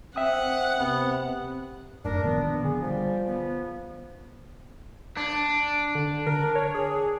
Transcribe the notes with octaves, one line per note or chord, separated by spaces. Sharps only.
C4 E5 F#5 G5 D#6
C3 B3
F1 F#2 A2 D4 A#4
A#2 D#3 F3 B3
D3 G#4
F3 G3
B3
D4
D3
A#4
C#5
G#4